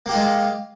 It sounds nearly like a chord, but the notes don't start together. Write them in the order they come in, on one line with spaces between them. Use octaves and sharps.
A#3 G4 F4 G#3